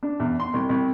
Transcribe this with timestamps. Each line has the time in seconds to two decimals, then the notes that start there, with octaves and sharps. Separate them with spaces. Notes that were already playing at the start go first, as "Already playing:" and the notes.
0.03 D4
0.20 E2
0.40 C6
0.54 C2
0.69 C2